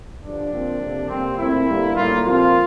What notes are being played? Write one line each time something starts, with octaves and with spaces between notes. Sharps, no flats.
G2 D3 F3 D4
A#2 F3 C4
F2 C3 F3 A#3
C3 G3 A#3 C4
A#2 A3 C4 E4
G2 D3 G3 A#3
A2 G3 A#3 F4
A#2 F3 C4 F4